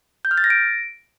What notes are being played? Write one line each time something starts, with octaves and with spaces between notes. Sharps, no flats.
G6
F6
A6
A#6
D7